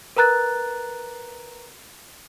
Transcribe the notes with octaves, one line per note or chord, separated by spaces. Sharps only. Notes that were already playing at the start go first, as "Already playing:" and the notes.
A#4 B4 A#5 F#6 A6